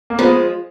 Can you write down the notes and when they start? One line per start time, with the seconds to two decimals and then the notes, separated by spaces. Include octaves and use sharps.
0.10 A#3
0.19 F3 G#3 B3